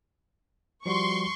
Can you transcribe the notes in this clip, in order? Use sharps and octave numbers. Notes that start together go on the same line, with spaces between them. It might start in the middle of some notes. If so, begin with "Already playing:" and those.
F3 G3 F#4 C6 C#6